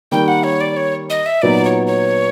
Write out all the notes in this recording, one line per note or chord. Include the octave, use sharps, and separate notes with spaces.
D#3 G3 A#3 G5
F#5
C#5
D5
C#5
D#5
E5
A#2 F#3 B3 D#4 D5
C#5
C#5